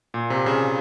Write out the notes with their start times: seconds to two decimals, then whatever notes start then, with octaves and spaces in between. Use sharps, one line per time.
0.14 A#2
0.30 C3
0.46 C#3